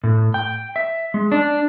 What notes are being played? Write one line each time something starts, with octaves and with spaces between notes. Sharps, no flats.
A2
G5
E5
G#3
D4